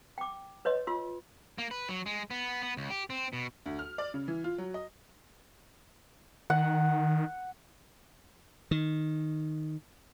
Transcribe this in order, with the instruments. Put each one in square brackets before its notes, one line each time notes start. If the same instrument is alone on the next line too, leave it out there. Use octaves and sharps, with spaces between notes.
[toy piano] G5 D6
B4 C#5 D#5 C6
F4 C6 E6
[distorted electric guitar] A#3
B4
F#3
G#3
B3
B3
C#2
G4
C4
B2
[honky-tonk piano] D2
F6
D5
C#3
E3
F4
F#3
D#5
[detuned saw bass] D#3 [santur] F#5
[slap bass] D#3